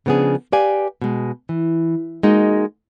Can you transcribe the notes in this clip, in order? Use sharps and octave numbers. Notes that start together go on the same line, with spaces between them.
C#3 F3 B3 D4 G#4
G4 B4 D5 F5 G#5
B2 G#3
E3
G#3 A#3 D#4 F#4